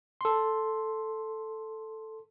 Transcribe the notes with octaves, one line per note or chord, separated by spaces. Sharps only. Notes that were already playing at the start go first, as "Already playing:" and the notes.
A4 C6